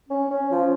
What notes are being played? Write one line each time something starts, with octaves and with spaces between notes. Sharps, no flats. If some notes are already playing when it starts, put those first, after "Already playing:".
C#4
C#4
F3